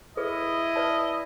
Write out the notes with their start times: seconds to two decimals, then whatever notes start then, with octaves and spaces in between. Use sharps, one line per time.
0.17 E4 G#4 A4 B4 D#5
0.76 B4 D5 A5